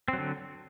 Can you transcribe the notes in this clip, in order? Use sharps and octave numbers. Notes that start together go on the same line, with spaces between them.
D3 F#3 C4